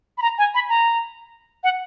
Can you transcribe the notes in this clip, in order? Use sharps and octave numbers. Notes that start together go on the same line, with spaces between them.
B5
A#5
G#5
B5
A#5
F#5